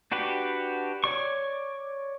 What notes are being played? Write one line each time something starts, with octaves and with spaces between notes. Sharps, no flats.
D4 F#4 G4 B4
C#5 D5 C#6